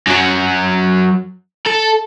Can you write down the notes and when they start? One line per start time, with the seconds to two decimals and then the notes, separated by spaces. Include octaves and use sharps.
0.07 F#2 F#3
1.67 A4